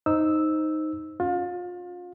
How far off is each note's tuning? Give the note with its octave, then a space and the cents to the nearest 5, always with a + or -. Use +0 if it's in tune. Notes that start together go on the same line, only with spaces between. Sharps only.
D#4 +0 C5 +0 E6 -5
C#4 +15 F4 +30